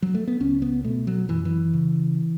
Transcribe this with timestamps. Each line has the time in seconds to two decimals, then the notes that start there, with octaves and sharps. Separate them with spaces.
0.02 F#3
0.15 A3
0.27 B3
0.40 C#2 C#4
0.62 B3
0.84 B2 A3
1.07 F#3
1.28 F#2 E3
1.45 E3
1.73 C#3